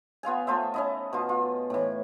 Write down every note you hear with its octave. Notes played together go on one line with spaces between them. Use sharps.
B3 F4 F5 G#5
A3 F4 C5 E5
C#4 E4 D#5
B2 F4
F4
A2 E3